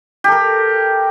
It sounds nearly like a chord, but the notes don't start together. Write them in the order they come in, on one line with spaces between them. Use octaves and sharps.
G4 A4 A#4